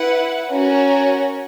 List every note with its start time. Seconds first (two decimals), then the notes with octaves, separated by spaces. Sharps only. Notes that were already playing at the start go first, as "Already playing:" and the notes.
Already playing: E4 B4 F#5
0.50 C#4 F#4 A#4 C#5